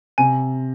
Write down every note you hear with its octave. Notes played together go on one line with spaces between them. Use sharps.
C3 G#5